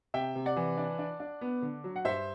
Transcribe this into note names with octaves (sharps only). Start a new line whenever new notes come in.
C3 E5 G5
C3
D5 F#5
E3
D4
D4
D4
B3
D3
F#3
F#5
G2 C5 E5